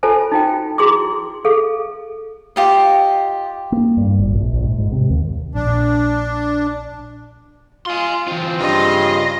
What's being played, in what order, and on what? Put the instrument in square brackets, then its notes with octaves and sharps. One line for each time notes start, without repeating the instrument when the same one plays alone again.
[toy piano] F4 A4 C5 G#5 A5
D#4 F4 F#4 G5
E4 F#4 G#4 C6 D6
G#4 A4 F5
[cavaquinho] F4 G4 D#5
[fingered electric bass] A#3
G2
G#1
A#1
A#1
G#2
G#2
C3
D#2
[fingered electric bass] A#1 [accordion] D4
[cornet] F4 [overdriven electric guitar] G#5 C6
[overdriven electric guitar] E3 F4 [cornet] C4
[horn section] G2 C#3 C6 [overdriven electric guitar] F4 [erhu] D#5